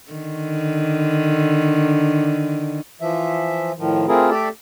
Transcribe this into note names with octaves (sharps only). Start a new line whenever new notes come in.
D3 D#3
E3 F3 E5
A2 D#3 F3
A3 C4 E4 F4 G#4 A#4
A3 G4 A4 D5 E5